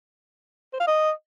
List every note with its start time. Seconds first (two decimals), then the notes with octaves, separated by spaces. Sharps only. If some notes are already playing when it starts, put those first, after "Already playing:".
0.73 C5
0.80 F5
0.87 D#5